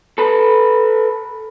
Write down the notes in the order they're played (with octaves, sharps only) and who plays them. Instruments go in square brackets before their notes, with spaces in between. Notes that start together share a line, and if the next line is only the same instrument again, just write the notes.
[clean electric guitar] A4 B4